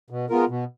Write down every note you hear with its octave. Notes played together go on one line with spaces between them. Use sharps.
B2
G#3 B3 F4 A#4
B2